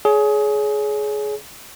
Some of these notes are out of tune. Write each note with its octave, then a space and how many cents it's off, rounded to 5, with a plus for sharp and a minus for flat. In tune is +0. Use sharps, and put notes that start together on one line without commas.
G#4 +20 C#5 +30